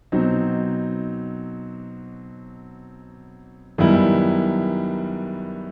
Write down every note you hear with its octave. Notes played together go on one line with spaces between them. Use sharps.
B2 F#3 C4 D#4
F#2 D#3 G3 B3 E4